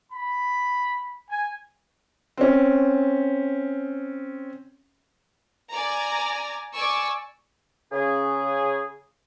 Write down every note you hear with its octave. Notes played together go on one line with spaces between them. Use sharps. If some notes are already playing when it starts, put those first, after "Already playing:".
B5
G#5
C4 C#4
D5 G#5 A#5
D5 G#5 C#6 E6
C#3 G#4